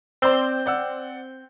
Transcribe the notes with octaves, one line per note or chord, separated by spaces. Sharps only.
C4 C5 D5 E6 G6
D5 F#5 E6